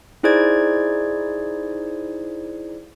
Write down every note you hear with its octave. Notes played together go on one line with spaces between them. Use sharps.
D#4 E4 G#4 C5 D5 G#6